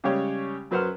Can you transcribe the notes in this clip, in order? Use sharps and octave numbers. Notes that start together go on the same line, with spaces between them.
C#3 G3 G#3 G4 C#5
F#2 F#3 B4 C5 F#5 F6